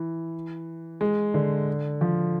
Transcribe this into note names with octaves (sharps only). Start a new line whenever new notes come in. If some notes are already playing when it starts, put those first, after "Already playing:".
Already playing: E3
G#3
D3
F3